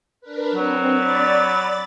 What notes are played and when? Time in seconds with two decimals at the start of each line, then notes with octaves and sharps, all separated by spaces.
0.21 D4 A#4 B4
0.54 F#3 C4
0.90 D5 B5 A6